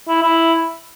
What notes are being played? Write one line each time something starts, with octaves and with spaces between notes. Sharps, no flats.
E4
E4